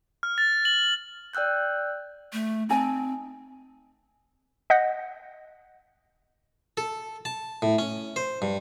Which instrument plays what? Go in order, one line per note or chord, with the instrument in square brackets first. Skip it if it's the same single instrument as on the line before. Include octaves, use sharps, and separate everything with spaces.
[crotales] F6
A6
F#7
[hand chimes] D5 G5 E6 F#6 G6
[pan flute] A3
[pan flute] C4 [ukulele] D#4 G#5 A5
[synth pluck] D#5 F#5 G6 A#6 B6
[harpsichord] A4
A5
A2
C#4
C5
G2